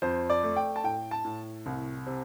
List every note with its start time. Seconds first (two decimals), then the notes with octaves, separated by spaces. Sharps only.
0.02 F2 C5
0.30 D5
0.43 A3
0.56 G5
0.76 A5
0.84 A2 G5
1.11 A5
1.24 A2
1.66 C2
2.07 C3